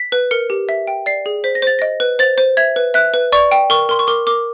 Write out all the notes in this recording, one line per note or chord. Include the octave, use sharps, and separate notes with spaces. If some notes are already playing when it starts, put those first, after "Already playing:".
Already playing: B6
B4
A#4 C#7
G4
E5
G5
D5 C7
G#4
C5 B6
A#6
C5 A6
D#5 A#6
B4
C5 A6
C5
E5 G#6
B4
E5 F#6
B4
D5 C#6
G5
A#4 C#6
A#4 C6
C#6
A#4 D6
A#4 D6